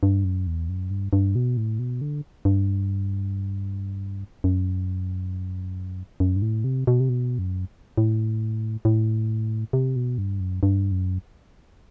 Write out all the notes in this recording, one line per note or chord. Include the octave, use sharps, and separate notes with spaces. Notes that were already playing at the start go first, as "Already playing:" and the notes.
G2
F#2
E2
F#2
G2
G2
B2
A2
B2
D3
G2
F#2
F#2
G2
A2
C3
B2
C3
B2
F#2
A2
A2
C3
B2
G2
F#2
G2
F#2